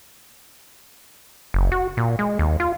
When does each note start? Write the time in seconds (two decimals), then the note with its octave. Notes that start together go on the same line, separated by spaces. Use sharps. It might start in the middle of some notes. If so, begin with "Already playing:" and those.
1.54 F#1
1.72 F#4
1.97 A#2
2.19 G#3
2.39 D#2
2.60 F4